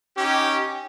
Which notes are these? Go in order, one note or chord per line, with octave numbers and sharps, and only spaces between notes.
C#4 D#4 G4